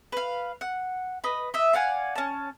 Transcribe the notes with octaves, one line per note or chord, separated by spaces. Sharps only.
B4 F5
F#5
B4 D#5
D#5 E5
D5 F5 F#5 G#5
C#4 A5